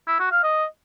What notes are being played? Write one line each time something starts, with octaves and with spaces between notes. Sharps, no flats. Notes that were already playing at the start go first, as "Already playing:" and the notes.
E4
F#4
F5
D#5